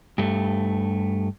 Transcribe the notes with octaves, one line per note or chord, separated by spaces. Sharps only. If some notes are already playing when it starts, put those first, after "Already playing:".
G2 A3